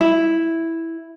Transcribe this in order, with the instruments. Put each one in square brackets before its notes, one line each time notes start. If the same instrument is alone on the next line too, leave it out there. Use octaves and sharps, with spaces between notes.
[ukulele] E4